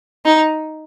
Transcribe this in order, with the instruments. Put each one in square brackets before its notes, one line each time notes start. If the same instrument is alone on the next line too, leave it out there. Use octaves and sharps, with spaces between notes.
[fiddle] D#4